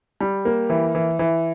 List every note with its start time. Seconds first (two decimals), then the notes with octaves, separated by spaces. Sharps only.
0.21 G3
0.45 A#3
0.70 E3
0.95 E3
1.19 E3